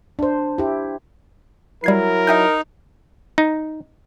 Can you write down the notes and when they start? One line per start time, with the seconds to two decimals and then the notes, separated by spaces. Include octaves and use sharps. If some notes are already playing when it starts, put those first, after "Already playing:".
0.19 D4 C5
0.58 E4 G4
1.84 F#3 G3 E4 A#4 G#6 C7
2.27 D#4 E5 G#5 G6
3.38 D#4